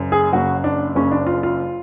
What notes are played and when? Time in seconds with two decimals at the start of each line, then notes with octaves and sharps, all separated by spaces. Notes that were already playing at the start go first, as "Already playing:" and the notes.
Already playing: F#1 F#2 C#3
0.12 G#4
0.32 F#1 F#2 C#3 F#4
0.64 D4
0.95 F#1 F#2 C#3 C#4
1.12 D4
1.27 F4
1.43 F4